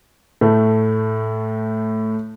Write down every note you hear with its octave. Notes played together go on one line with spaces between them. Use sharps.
A2 A3